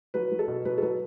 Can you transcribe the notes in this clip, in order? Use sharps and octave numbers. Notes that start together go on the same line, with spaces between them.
F#3 B4
F#3
A4
B2
F#3 B4
A4
F#3 B4